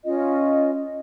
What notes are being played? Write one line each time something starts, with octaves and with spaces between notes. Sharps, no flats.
C#4 F4 D#5